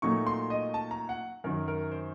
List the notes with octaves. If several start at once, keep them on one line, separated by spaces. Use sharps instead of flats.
A#2 F#3 A3 D#4 C#6
C6
D#5
A5
A#5
F#5
F#2 D#3 F#3 A#4
A#4
C5